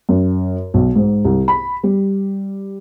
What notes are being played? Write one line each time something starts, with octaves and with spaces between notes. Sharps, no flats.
F#2
B1
G#2
C2
B5
G3